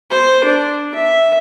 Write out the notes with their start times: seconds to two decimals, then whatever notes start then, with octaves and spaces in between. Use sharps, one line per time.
0.11 C5
0.44 D4
0.95 E5